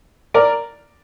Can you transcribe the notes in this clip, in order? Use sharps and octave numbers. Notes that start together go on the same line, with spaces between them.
A#4 D5